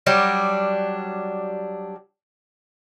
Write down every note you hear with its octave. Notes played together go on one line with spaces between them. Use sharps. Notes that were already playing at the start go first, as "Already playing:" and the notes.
F#3 G3 D4